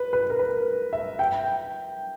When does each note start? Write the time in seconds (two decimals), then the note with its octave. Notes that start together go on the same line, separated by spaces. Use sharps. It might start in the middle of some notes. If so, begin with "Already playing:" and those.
Already playing: B4
0.13 B4
0.30 A#4
0.39 B4
0.93 E5
1.19 G5